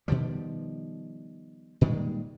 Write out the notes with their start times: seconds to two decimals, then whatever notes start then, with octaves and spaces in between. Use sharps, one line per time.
0.08 B2 D#3 F3 G3
1.81 A#2 D#3 G3 G#3